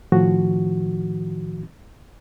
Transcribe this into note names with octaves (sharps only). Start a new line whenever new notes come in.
A2 D#3 F3 F#4